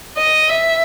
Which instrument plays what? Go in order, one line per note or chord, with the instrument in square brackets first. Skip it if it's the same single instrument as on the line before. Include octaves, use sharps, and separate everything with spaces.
[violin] D#5
E5